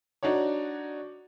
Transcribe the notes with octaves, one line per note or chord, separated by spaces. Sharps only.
D4 D#4 F#4 C#5